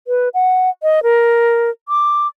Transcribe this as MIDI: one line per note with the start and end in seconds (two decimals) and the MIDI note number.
0.07 0.29 71
0.34 0.70 78
0.83 1.00 75
1.03 1.70 70
1.89 2.28 86